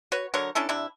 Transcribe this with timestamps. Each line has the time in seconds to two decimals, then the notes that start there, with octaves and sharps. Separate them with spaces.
0.12 F#4 B4 C#5
0.34 D3 F#3 A#4 C#5
0.55 C#4 D4 E4 A4
0.69 C3 D4 E4